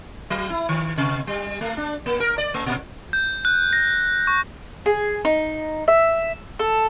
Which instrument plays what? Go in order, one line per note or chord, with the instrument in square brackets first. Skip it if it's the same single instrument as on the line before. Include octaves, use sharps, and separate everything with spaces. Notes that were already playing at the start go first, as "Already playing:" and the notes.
[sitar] F#3
E4
D#3
C3
G3
A3
D4
A#3
A#4
D5
A3
A#2
[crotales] G6
F#6
A#6
C#6
[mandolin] G#4
D#4
E5
A4